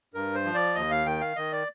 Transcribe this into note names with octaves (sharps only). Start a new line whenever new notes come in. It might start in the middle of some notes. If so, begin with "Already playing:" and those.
G2 A#4
C5
F3
D5
D#2 D#5
F5
D#3 G5
F5
D#3 D#5
D5